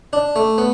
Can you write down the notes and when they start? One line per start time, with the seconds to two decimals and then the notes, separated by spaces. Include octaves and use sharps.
0.13 D4
0.36 A3
0.58 B3